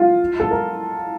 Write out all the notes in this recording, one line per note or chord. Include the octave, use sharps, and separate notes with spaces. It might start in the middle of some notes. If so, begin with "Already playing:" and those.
Already playing: F4
A4
A#4